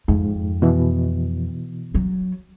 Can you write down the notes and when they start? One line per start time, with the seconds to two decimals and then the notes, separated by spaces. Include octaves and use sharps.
0.08 F2 G#2
0.62 B2 E3
1.95 F#3